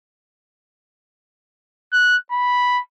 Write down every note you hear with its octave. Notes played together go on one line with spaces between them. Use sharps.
F#6
B5